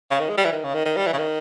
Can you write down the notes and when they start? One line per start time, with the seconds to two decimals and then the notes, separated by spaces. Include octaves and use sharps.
0.11 C#3
0.20 D#3
0.29 G#3
0.37 G3
0.45 E3
0.52 D#3
0.64 C#3
0.74 D#3
0.85 D#3
0.96 G3
1.06 E3
1.13 C#3
1.18 D#3